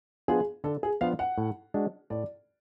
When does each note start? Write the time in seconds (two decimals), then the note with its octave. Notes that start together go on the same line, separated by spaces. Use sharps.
0.28 F3 B3 D4 F4 G#4
0.64 D3 A4
0.83 G#4
1.01 F3 B3 D4 F4 F5
1.19 F#5
1.38 A2
1.74 G#3 D4 F#4
2.10 A2 D5